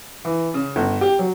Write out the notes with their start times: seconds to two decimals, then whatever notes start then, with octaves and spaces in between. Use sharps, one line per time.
0.25 E3
0.54 C#3
0.76 G1
1.01 G4
1.19 F#3